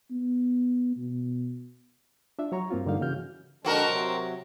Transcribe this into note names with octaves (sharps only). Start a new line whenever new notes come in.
B3
B2
D4 F4 E5
F#3 C#5 A#5 C#6
G2 A#3 C4 F4
G2 D3 A#3 D#4 F5
C#3 E3 F#4 F6 G6
D3 G#3 C4 D4 F#4 A#4
C3 F#3